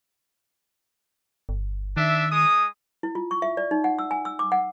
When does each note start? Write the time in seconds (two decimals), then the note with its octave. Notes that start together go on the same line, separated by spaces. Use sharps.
1.49 G1
1.97 D#3 D4 E5
2.30 G#3 D#6
3.03 E4
3.15 F4
3.31 C#6
3.42 E5
3.57 D5
3.71 D#4
3.84 F#5
3.99 E6
4.11 G#5
4.25 E6
4.39 D6
4.52 F#5